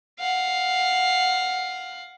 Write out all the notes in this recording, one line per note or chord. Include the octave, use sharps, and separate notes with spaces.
F5 F#5